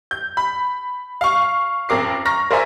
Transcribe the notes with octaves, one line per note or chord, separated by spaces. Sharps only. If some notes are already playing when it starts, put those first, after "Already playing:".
G6
B5
F5 C#6
A1 F2 A#4 D6 C7
A#5 C#6 F6 A#6
A#4 C5 D5 E5 G#5 A#5